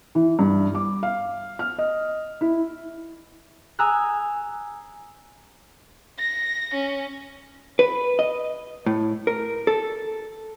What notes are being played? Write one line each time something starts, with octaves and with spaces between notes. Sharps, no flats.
E3
G2
D6
F5
F6
D#5
E4
G#5 A#5 D#6 E6 F#6
A#6
C#4
B4
D#5
A2
A#4
A4